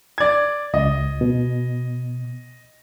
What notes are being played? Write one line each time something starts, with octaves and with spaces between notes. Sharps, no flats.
D5 G#6
C#2 D#5
B2